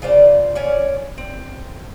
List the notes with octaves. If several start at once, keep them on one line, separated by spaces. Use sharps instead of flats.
C#3 F4 C5 D5
C#4 F4 C#5 D5
C4